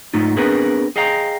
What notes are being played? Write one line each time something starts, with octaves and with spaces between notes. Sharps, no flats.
G#2 A3 D#4 F4
B3 C4 D4 G#4 A#4 B4
G#4 D#5 F5 G5 A#5